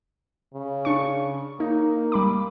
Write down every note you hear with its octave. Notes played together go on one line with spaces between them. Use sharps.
C#3
D4 C#6
A#3 D#4
G3 B5 D6